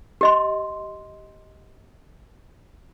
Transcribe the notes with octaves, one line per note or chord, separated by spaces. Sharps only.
G4 D#5 C6